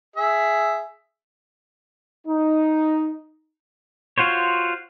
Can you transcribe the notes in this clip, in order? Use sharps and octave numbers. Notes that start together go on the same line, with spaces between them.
G#4 E5
D#4
F4 F#4 C5 C#5